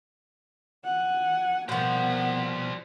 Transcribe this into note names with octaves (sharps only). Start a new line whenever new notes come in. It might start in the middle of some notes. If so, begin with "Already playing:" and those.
F#5 G#5
B2 F3 G3 A#3 B3 C5 F#5